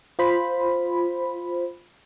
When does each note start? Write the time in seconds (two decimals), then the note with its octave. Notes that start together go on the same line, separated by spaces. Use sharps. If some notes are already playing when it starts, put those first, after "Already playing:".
0.19 F4 C5 B5